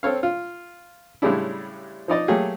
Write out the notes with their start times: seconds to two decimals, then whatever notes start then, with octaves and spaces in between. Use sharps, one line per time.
0.03 C4 A4 C#5 F5
0.23 F4
1.22 A2 C#3 G3 G#3 D4 E4
2.08 F3 D#4 D5 D#5
2.28 F#3 A3 A#3 G4 G#4